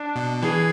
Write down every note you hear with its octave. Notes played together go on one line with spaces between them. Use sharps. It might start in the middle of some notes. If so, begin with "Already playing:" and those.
Already playing: D4
B2
E3 G#4